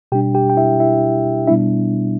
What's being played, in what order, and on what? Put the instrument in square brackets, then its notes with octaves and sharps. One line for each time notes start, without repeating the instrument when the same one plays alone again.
[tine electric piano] B2 G3 D4 G4 G5
G4 G5
G5
E4 E5
E4 E5
B2 G3 B3 D4 E4 E5